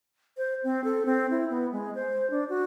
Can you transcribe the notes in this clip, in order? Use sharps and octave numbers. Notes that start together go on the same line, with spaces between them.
C5
C4
A4
C4
E4
B3
G#3
C5
D4
F#4